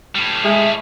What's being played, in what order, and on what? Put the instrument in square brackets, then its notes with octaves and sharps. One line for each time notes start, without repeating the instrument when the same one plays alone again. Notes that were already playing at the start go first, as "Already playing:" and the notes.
[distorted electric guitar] A2 G3
[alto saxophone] G#3 [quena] E5